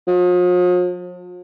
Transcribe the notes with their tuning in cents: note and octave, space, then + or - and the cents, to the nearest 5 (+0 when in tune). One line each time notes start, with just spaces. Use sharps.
F3 +45